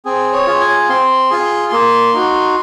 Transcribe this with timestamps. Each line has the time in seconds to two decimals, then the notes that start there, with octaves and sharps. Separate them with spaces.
0.05 C4 G#4
0.33 C#5
0.47 F4 G#4
0.60 G#5
0.89 C4 C6
1.30 F4 G#4
1.72 A#3
2.13 D#4 F#4